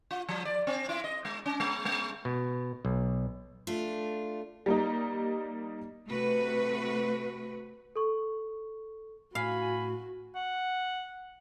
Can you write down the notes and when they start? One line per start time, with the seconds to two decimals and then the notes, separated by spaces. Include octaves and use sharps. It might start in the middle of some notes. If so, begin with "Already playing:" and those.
0.11 F4
0.29 F3
0.45 D5
0.67 C4
0.89 E4
1.04 D#5
1.25 G#3
1.46 C#4
1.60 G#3
1.85 G#3
2.25 B2
2.85 B1
3.67 A3 D4 F4
4.66 G3 A#3 D#4
6.08 C3 A3 F#4 B4
7.96 A4 C#6
9.35 A2 F#4 F5 G#5 B5
10.36 F#5